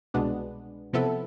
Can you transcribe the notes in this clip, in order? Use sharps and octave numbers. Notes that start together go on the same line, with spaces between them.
C2 B2 G#3 B3 D4
C3 F3 B3 E4 A4